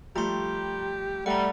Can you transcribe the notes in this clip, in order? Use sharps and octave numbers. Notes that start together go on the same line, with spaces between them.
F3 G3 A3 G4 A#5 C6
G3 A3 F#5 A#5